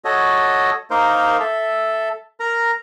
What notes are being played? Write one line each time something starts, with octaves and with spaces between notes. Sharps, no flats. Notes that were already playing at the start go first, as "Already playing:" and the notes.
F#4 A4 C#5 D#5
A#3 D#4 A#4 C5
A4 E5
A#4 A#5